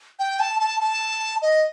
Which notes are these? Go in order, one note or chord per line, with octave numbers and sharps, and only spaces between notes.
G5
A5
A5
A5
D#5